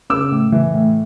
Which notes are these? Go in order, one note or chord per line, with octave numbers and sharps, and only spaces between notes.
C#3 D6 E6
A2
E3
A2